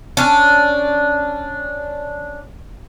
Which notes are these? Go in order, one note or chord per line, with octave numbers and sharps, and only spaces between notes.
C#4 D4